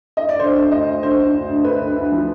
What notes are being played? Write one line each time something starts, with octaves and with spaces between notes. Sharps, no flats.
D#5
D5
D3 C5
D2
D2 D#5
D2
D3 C5
D3
D2
D2
D2 B4
D2
D2
F3